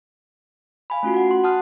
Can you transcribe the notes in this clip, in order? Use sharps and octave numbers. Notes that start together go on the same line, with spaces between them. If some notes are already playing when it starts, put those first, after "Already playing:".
F5 G#5 B5
A3 C#4 F4 F#4
F#4 F#5
C6
F#5 A5 D#6 F6 F#6